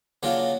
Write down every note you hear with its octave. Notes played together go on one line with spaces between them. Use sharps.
C#3 F#3 A#3 D4 F4